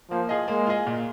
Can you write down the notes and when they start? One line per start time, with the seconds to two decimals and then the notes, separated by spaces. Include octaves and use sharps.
0.10 F3 A#3
0.29 F4 G#4 D#5
0.48 G#3 A#3
0.67 F4 G#4 D#5
0.87 A#2